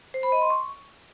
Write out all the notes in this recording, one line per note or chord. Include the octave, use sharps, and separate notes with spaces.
C5
B5
D#5
C6
C#6